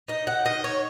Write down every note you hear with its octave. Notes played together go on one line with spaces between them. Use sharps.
D#4 D#5
F#5
D#3 D#5
C#5